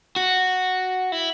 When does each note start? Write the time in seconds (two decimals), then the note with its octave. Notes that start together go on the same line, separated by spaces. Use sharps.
0.16 F#4
1.12 E4